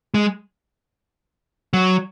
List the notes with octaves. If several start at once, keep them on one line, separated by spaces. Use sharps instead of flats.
G#3
F#3